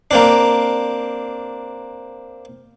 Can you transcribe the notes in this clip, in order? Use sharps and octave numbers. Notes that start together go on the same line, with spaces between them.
A#3 C4 D4